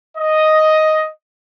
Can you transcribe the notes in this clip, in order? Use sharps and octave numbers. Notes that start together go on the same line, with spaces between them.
D#5